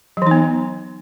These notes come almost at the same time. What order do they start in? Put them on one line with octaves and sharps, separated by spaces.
F#3 E3 D#4 B3